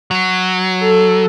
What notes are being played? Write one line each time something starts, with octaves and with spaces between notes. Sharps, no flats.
F#3
A4